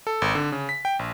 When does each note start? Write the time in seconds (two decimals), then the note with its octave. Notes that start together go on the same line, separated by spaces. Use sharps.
0.07 A4
0.22 G#1
0.35 D3
0.52 C#3
0.69 B6
0.85 G5
0.99 A#1